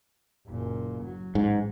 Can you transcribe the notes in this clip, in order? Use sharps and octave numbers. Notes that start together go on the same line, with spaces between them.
F#1 A#2
F#3
A1 G#2